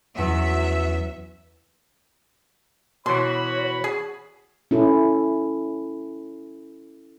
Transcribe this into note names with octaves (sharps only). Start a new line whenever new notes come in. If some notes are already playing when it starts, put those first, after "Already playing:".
E2 F#3 C#4 E5 F#5
B2 E3 F#4 C#5 B5 C6
G#4
C#4 E4 A4